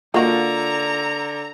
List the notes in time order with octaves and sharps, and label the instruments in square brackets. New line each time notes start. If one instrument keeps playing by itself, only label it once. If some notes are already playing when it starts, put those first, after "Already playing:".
[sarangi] D3 [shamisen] A#3 F#4 [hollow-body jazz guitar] F4 D#5 [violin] A#5